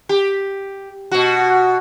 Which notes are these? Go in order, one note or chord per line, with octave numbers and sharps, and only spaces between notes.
G4
B2 F#4